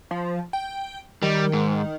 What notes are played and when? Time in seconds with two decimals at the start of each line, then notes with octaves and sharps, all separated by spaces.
0.11 F3
0.53 G5
1.22 D#3 G3
1.53 G#2